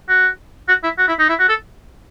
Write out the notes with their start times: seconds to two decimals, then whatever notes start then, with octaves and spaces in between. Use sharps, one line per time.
0.09 F#4
0.68 F#4
0.83 E4
0.98 F#4
1.08 E4
1.19 D#4
1.29 E4
1.39 F#4
1.49 A4